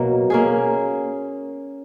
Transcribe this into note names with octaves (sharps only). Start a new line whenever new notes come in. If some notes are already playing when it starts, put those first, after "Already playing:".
Already playing: B2 F#3 A#3
A#3 C#4 G#4